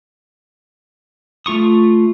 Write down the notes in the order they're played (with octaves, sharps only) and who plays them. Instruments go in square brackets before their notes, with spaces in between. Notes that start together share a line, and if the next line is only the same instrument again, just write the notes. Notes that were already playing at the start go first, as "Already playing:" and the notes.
[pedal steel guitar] A3 F4 C#6 D#6